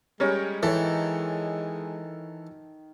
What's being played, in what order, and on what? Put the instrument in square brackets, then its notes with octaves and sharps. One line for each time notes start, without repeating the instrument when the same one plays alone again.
[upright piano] G3 C#4 C#5 [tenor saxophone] G#3 [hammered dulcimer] A#4 G5
[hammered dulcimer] D#3 [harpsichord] E3 [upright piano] A4 C#5